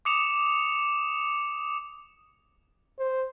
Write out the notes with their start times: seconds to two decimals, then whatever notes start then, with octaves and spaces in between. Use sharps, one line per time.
0.05 D6 D#6 C#7 E7 F7
2.99 C5